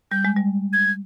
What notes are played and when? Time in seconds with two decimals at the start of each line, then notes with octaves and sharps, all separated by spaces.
0.11 G3 G6
0.25 G#3
0.37 G3
0.73 G#6